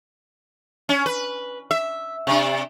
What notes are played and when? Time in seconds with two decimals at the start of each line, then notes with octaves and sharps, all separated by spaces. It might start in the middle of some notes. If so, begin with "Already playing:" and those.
0.89 C#4
1.06 B4
1.71 E5
2.27 C3 D4